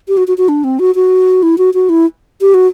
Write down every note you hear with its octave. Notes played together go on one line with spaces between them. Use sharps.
G4
F#4
F#4
F#4
D4
C4
F#4
F#4
E4
F#4
F#4
E4
G4
F#4